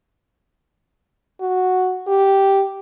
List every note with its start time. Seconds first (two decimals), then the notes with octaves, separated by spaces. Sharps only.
1.41 F#4
2.07 G4